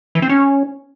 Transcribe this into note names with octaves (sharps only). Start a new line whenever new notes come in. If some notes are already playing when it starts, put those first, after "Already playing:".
E3
C4
C#4